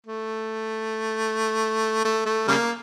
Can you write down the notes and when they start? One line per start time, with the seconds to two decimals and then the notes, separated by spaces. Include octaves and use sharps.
0.06 A3
2.04 A3
2.26 A3
2.48 C#3 G3 A#3